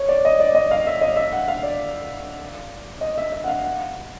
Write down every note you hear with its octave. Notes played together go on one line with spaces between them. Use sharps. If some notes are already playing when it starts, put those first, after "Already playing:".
Already playing: C#5
D5
D#5
D5
D#5
F5
E5
D#5
E5
F#5
F5
D5
D#5
E5
E5
F#5
F5
F#5